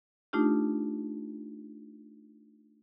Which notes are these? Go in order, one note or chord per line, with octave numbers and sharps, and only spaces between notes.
A3 D4 D#4 F4 G4